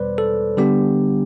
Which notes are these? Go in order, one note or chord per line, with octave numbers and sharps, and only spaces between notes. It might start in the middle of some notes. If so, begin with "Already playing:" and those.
Already playing: E2 B2 G3 B4 C5 D5
A4
D3 G3 B3 D4 G4